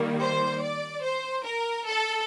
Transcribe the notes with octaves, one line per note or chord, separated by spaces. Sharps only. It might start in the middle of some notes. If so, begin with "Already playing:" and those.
Already playing: D#3 G3 A#3
C5
D5
C5
A#4
A4